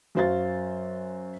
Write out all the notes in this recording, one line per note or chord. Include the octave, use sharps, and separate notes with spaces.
F#2 F#4 C5 F5 A6